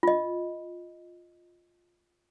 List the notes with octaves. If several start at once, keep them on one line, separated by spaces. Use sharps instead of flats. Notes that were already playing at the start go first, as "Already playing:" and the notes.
F4 D#5